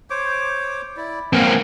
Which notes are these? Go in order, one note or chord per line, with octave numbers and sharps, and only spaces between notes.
C5 C#5 D6
E4 D5
A#3 C4 F5 F#5 G#5